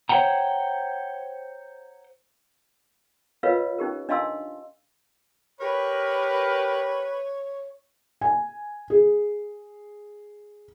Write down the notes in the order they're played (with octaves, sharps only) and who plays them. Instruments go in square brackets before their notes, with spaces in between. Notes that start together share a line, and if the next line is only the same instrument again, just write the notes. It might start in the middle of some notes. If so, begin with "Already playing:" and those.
[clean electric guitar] C5 C#5 E5 F#5 G5 A#5
[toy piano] F4 A#4 B4 C#5 D#5 F5
C#4 D#4 G4 A#4
D4 D#5 F5 A5 C6 E6
[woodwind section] G4 A#4 B4 [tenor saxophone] C#5
[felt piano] G#5
G#4